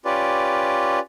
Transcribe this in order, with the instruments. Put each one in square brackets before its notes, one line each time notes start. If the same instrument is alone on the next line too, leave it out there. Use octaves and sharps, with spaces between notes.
[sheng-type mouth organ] C#4 F4 G4 B4 D5